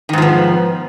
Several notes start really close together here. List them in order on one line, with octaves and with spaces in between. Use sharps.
D#3 G#2 F3 B3